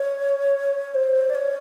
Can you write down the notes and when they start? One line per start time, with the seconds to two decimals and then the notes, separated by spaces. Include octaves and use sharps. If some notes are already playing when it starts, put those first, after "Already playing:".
Already playing: C#5
0.95 C5
1.30 D5
1.35 C#5